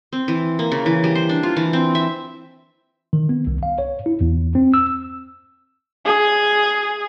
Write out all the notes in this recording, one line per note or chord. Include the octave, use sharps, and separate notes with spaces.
C4
E3
A#3
C#3
E3
G3
C5
D4
F4
E3
C4
E5
D#3
B3
C2
F5
C#5
E4
E2
C4
E6
G#4